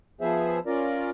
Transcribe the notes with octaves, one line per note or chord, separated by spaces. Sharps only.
F3 B3 G#4 C5 E5
C#4 F4 A#4 D5